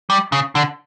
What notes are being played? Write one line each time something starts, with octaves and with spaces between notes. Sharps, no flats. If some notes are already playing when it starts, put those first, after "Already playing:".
G3
C#3
D3